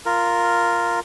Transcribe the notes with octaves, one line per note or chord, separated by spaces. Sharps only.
F4 A#4